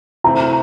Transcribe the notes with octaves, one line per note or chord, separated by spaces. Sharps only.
C3 E3 A3 C4 E4 A#5